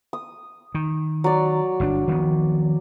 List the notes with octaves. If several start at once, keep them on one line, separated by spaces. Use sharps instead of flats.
D#6
D#3
F#3 D5
G1 C#3 D4
D#3 F3 B3